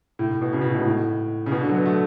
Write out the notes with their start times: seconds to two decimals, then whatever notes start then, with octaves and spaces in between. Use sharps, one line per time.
0.19 A2
0.31 A2
0.42 B2
0.53 C#3
0.61 B2
0.70 A2
0.77 G#2
0.85 A2
1.46 C#3
1.52 B2
1.60 D3
1.69 F#3
1.76 B3
1.86 A3